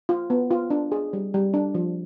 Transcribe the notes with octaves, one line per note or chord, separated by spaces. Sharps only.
F4
B3
F4
D4
G#4
G3
G3
D4
F3